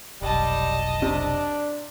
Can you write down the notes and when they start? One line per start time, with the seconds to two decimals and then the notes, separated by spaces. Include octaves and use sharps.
0.22 F1 B1 G3 D#5 A5
1.02 C3 D4